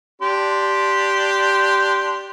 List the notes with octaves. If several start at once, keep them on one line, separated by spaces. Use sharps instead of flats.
D4 G4 C6